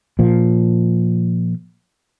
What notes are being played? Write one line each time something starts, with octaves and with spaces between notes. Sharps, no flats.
A#2 F3